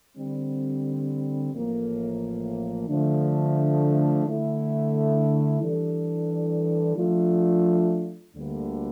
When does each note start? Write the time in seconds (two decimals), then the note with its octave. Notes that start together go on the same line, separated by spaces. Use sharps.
0.16 D3 G3 C4
1.52 A1 A2 F3 A#3
2.88 D3 F3 A3 D4
4.25 D3 A3 E4
5.61 E3 G3 D4 A4
6.97 F3 A3 D4 F4
8.34 D2 D3 G3 A#3